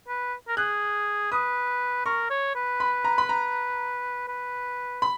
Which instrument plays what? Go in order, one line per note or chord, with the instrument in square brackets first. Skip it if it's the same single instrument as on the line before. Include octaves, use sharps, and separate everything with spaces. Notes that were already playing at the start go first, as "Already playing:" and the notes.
[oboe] B4
A#4
[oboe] G#4 [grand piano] F#6
[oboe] B4 [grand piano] D#6
[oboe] A#4 [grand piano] C#6
[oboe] C#5
B4
[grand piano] B5
A#5
B5
A#5
[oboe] B4
[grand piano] B5